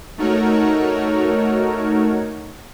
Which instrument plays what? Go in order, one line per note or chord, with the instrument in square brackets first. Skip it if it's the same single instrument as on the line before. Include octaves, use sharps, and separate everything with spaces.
[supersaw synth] A3 D#4 F#4 A#4 C#5